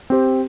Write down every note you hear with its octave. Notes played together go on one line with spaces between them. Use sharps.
C4 G4 C5